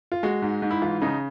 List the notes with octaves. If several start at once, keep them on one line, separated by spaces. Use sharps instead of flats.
F4
G#3 F#4
G#2
G#2
E4
E3 F4
C#3 D#4